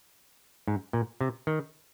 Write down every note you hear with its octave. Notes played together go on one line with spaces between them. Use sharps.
G#2
A#2
C3
D#3